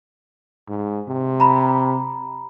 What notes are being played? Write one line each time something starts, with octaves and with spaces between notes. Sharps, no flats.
G#2
C3
A#5 B5